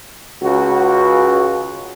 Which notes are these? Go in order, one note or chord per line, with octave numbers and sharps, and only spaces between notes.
C#2 F#4